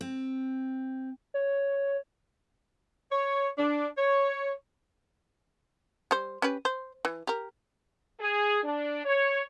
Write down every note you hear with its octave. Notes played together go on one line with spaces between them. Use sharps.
C4
C#5
C#5
D4
C#5
G3 C5
C#4 G4 B4
C5
E3
G4 A#4
G#4
D4
C#5